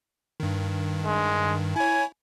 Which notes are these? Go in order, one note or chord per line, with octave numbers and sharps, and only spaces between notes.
G2 D#3
G#3
E4 C#5 G#5